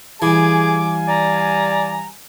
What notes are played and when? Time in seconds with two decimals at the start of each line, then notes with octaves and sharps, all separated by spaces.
0.22 E3 G3 G#4 F5 G#5 D6
1.08 D5 A#5